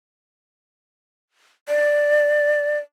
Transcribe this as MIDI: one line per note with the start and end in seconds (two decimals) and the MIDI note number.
1.68 2.79 74